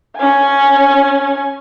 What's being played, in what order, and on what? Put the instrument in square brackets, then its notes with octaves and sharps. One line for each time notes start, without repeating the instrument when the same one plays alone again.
[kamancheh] C#4 G#5